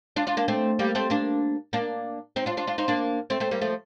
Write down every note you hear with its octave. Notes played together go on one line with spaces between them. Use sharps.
D4 F4
D4 F4
A#3 D4
A3 C4
G3 A#3
A3 C4
A#3 D4
A#3 D4
C4 D#4
D4 F4
D4 F4
D4 F4
C4 D#4
A#3 D4
A3 C4
A3 C4
G3 A#3
F3 A3